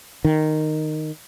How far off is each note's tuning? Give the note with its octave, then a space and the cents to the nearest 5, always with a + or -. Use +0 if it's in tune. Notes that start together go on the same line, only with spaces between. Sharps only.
D#3 -10